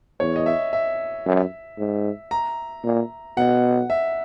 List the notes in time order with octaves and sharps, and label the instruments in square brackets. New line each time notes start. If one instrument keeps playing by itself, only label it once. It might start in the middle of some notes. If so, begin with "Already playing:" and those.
[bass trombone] E2 [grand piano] C#5
[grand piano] D#5
E5
E5
[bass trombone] F#2
G#2
[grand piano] A#5
[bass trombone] A#2
[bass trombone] B2 [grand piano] F#5
[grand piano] E5